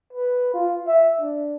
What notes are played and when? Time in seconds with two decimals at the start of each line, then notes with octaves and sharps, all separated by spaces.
0.13 B4
0.54 F4
0.87 E5
1.21 D4